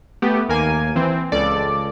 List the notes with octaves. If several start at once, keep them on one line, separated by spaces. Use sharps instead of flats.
A3 B3 G4
D#2 A#3 G#5
E3 C4
C#2 A4 D5